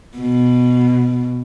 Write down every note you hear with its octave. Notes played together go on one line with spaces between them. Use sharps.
B2